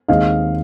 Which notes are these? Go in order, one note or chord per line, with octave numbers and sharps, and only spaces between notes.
D#2 D#3 G#3 C4 D#5 F5